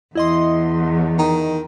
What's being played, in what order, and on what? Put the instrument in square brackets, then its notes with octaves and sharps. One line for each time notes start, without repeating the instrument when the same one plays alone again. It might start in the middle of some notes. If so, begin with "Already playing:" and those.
[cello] E2 [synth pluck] E4 D#5 C6
[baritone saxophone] D#3